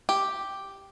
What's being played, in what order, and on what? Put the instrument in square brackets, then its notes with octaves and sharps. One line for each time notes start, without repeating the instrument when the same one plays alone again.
[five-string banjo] G4